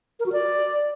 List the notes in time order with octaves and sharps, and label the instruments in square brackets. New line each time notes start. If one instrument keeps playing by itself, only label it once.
[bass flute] A#4
F#4
D5